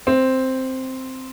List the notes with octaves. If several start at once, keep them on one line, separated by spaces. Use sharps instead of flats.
C4